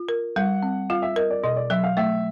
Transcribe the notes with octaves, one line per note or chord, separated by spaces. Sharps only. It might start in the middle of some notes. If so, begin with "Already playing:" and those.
Already playing: F4
A#4
G3 F#5
C4
F4 F5
E5
A#4 D#5
D5
B2 D#5
D5
F#3 E5
F5
A3 E5